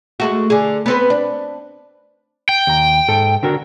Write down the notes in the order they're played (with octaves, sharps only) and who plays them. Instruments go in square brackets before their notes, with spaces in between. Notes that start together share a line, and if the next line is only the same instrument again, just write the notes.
[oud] G#3 A3 F#4
D3 G#4
B3 C4 B4
D4
[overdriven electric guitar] G5
[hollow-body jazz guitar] D#2 A#5
G#2 A4
D3 F#4 A#4